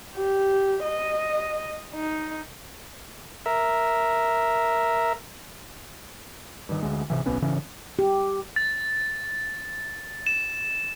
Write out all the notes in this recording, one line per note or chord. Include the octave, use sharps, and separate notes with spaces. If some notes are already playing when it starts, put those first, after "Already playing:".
G4
D#5
D#4
A#4 E5
G2 D#3
D2 G#3
G#1 C3 E3
D1 B1 B3 C#4
G#1 C#3 E3 C#4
G4
A6
E7